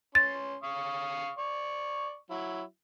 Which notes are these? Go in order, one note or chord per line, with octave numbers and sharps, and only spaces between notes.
C#4 C6 A6
F5 C#6 D#6
D5 C#6
F#3 E4